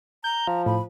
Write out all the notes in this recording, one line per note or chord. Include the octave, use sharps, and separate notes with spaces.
A#5 G6
F3
A2 B5